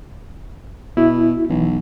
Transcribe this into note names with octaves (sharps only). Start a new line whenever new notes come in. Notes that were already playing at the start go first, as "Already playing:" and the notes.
B2 E4
B1 E3